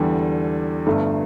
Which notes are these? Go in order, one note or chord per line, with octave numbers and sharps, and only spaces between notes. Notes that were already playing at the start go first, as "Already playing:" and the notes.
Already playing: E2 D3 G3
G1 G2 D3 A3